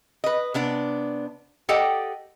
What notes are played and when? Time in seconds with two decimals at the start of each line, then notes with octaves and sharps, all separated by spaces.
0.24 B4 D#5
0.54 C3 B3 D4
1.69 G4 A4 D5 D#5 F#5 G5